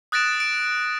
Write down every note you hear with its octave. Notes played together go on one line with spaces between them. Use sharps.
D#6 F#6 A6 A#6 D7 E7
D7